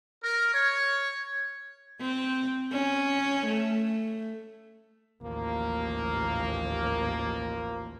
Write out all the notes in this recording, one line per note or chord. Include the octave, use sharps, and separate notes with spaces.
A#4
C#5
C4
C#4
A3
A1 D#2 F3 A#3